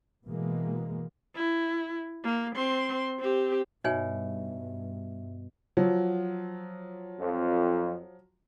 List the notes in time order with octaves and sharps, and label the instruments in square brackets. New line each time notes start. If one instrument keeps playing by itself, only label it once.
[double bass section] B2 E3 G#3 A#3
[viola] E4
A#3
C4 C6
C4 G4
[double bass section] G2 [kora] B2 [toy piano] D#4 C#5 G#5 [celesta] E5
[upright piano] F3 F#3
[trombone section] F2